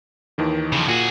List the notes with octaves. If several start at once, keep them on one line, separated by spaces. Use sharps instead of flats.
D#2 D#3 E3
C#3 F3
A#2 F#4 G#4